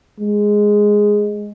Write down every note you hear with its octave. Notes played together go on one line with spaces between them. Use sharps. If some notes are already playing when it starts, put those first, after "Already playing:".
G#3